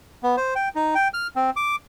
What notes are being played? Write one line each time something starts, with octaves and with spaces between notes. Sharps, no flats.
B3
C5
G5
D#4
G5
F6
C4
D6